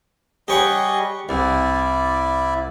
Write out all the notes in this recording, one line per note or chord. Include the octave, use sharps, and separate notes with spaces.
G3 G4 G#4 C#5 D#5 F#5
C2 E4 D5